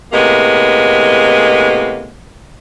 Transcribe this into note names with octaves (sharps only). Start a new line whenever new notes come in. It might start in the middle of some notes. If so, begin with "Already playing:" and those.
A2 C3 G#3 A#3 B3